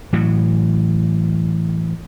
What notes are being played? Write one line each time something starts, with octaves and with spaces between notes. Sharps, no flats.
A2 E3 F#3